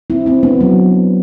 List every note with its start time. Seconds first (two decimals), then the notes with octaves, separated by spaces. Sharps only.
0.10 C4 E4
0.26 C4 E4
0.43 B3 D4
0.61 F#3